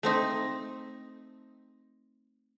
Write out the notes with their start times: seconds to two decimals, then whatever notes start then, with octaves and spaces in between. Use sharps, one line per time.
0.03 A3 C4 D#4